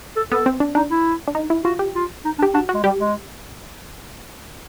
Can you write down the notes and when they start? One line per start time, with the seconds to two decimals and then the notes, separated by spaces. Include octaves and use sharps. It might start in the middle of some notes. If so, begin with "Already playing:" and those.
0.16 A4
0.32 B3 A4
0.46 C4
0.60 D4
0.75 D4 D#4
0.91 E4
1.28 D4
1.35 D#4
1.50 E4
1.64 F4 F#4
1.79 G4
1.95 F4
2.25 D#4
2.39 D4
2.43 G4
2.54 D4 F#4
2.69 F#4
2.74 G#3
2.83 G3 G4
2.99 G#3